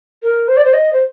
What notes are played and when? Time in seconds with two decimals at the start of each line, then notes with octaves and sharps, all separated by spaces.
0.23 A#4
0.48 C5
0.57 D5
0.64 C5
0.73 D#5
0.93 C5